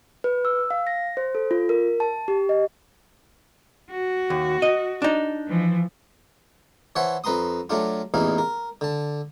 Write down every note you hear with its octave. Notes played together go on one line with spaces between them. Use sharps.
B4
E6
F5
A#6
C5
A4
F4
A#4
A5
G4
D#5
F#4
D#2
D#5
D4 D#4
E3 F3
E3 C5 C#5 E5 F#5 A5
F2 B4 A#5 C6 D#6
F#3 A3 D4 F4
A1 E2 A#2 E3 D#4 F5
A#4
D3 A5